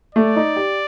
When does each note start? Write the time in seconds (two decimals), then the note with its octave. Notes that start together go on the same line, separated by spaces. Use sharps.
0.15 A3 D5
0.36 D#4
0.56 G4